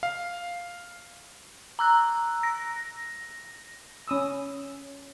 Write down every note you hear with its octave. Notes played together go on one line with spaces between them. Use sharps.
F5
A#5 E6 F#6
A#6
C#4 D#6 E6